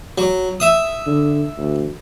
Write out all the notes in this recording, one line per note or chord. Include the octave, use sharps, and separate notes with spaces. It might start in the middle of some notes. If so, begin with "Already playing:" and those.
F#3
E5 D#6
D3
D2